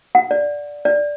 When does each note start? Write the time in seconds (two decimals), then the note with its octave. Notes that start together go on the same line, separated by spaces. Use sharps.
0.15 F#5
0.31 D5
0.85 D5